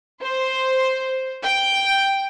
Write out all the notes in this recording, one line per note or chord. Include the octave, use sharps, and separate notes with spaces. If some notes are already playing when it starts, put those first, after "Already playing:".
C5
G5